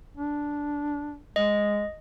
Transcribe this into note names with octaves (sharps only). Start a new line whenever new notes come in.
D4
G#3 D#5